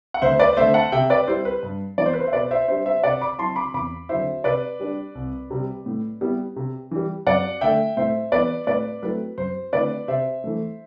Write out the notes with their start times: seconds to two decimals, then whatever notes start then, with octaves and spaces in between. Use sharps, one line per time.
0.14 F#5
0.22 D2 C5 E5
0.39 B4 D5
0.57 D3 A3 C5 E5
0.74 F#5 A5
0.92 C3 E5 G5
1.10 B4 D5
1.27 G3 C4 E4 C5
1.45 B4
1.63 G2
1.98 E3 B3 D5
2.06 C5
2.13 B4
2.20 C5
2.27 E5
2.33 B2 B4 D5
2.51 C5 E5
2.68 G3 D4 C5 E5
2.86 C5 E5
3.03 C3 D5 F#5
3.21 B5 D6
3.39 F#3 C4 E4 A5 C6
3.56 B5 D6
3.74 E2 B5 D6
4.09 D3 F#3 C4 E4 C5 E5
4.44 C3 B4 D5
4.80 G3 D4
5.15 C2
5.51 C3 G3
5.86 A2
6.21 G3 B3 E4
6.56 C3
6.91 E3 G3
7.26 F#2 D5 F#5
7.61 D3 A3 E5 G5
7.97 A2 C5 E5
8.32 E3 B3 B4 D5
8.67 A2 B4 D5
9.02 F#3 A3 C4 E4 B4
9.38 F#2 C5
9.73 D3 A3 C4 E4 B4 D5
10.08 C3 C5 E5
10.44 E3 A3